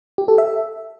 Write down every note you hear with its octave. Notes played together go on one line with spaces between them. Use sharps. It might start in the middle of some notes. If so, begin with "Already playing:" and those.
G4
A4
E5